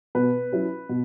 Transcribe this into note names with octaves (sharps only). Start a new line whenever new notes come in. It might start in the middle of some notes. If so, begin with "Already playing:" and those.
B2 B4
F#3 C#4 E4
B2